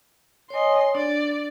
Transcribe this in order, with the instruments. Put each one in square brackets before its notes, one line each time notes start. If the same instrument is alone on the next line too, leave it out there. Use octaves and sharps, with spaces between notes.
[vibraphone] C#5 G#5 [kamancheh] D#5 C6
[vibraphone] D4 [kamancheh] D5